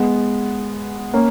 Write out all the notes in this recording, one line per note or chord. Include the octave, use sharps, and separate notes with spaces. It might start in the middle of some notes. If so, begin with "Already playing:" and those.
Already playing: G#3 B3
A#3 C#4